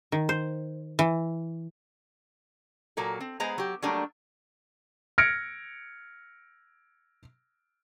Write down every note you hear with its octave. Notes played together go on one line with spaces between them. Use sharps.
D#3
C5
E3
A#2 F#3 A#3 A4
C4
G#3 B3 G#4 C5 A#5
F#3 G4
F#3 G3 A3 A#3 D4
F6 G#6 A#6 C#7 D7